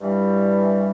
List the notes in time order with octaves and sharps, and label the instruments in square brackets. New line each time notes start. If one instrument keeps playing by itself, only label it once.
[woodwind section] G2 E3 G3